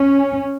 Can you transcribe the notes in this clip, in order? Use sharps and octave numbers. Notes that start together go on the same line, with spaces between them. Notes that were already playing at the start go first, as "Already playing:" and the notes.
Already playing: C#4